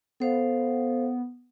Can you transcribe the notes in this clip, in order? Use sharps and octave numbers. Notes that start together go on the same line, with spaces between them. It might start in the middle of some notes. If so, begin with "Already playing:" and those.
B3 A4 C5 F5